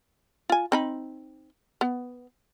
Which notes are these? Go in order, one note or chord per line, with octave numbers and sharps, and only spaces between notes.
F4 G#5
C4 D#4 B5
B3